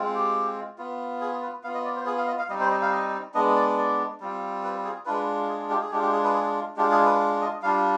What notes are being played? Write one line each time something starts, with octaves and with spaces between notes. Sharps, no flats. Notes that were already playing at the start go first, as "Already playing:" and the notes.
Already playing: G#3 C4 F4
G4
B3 F4
G#4
B4
B3 F4 F5
D#5
D5
C5
G#4
F5
D#5
F5
G3 C4 D#4 D#5
C5
D#5
F5
D#5
G#3 B3 D4 D#5
D5
D5
G3 C4 F4
B4
G#4
G#3 D4 F4 B4
G#4
G4
G#4
G#3 D4 F4 G4
G4
G#4
B4
G#4
G#3 D4 F4 G4
G#4
B4
D#5
G3 D4 F4 F5